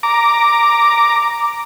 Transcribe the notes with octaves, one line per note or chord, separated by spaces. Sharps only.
A#5 D6